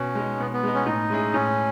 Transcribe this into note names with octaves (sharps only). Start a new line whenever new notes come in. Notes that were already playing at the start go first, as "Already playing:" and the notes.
Already playing: B2 C#4
G#3 D#4
B2 B3
B3
G#3 D#4
C#4
A2 D#4
G#3 C#4 E4 G#4
A2 C#4